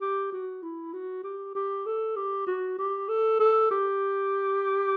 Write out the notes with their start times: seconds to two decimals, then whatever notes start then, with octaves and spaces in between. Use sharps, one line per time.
0.01 G4
0.32 F#4
0.63 E4
0.93 F#4
1.24 G4
1.55 G4
1.86 A4
2.16 G4
2.47 F#4
2.78 G4
3.08 A4
3.39 A4
3.71 G4